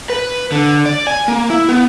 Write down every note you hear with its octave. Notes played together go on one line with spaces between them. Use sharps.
B4
D3
D5
G#5
A#3
E4
B3